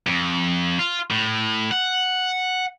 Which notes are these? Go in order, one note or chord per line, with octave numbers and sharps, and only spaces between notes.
F2
F4
A2
F#5